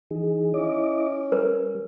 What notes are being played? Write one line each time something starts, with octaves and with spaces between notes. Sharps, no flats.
E3 D#4 G#4
C#4 E4 D#5 D6
G3 A#4 B4